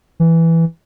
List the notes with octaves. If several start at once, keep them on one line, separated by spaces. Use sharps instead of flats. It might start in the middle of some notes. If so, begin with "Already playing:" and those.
E3